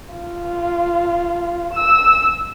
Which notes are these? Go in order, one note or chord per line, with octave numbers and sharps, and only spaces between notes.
F4
E6